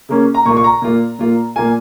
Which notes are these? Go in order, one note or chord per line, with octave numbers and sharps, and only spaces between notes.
C#3 A#3 C#4
A#5
A#2 A#3 F4 C#6
C#6
A#5
A#2 A#3 F4
A#2 A#3 F4
A#2 A#3 F4 G#5